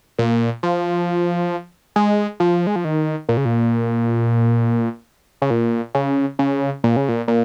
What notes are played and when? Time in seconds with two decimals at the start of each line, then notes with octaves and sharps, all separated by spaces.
0.19 A#2
0.63 F3
1.96 G#3
2.40 F3
2.67 G#3
2.76 F3
2.85 D#3
3.29 A#2
3.37 C#3
3.45 A#2
5.42 C#3
5.50 A#2
5.95 C#3
6.39 C#3
6.84 A#2
6.97 C#3
7.09 A#2
7.28 A#2